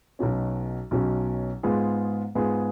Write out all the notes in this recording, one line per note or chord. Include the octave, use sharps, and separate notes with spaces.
B1 B2 F#3 C#4
B1 B2 F#3 C#4
G#2 G#3 B3 F4 G#4
G#2 G#3 B3 F4 G#4